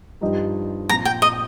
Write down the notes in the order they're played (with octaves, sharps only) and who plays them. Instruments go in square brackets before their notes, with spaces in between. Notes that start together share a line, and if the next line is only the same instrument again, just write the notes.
[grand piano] G2 F3 D#4 G4 D#5
[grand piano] A#2 F3 C4 F4 [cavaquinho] A#5
[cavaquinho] G5
D#5